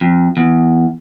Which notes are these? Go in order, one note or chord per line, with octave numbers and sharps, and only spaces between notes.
F2
E2